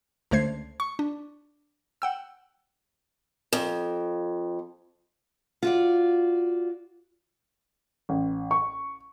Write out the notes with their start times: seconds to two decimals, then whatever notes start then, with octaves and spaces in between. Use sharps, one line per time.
0.31 C#2 D3 A3 C5 G#6 C7
0.80 C#6
0.99 D4
2.02 F#5 G5 E6
3.53 F2
5.63 F4 F#4 D5
8.09 A1
8.51 C#6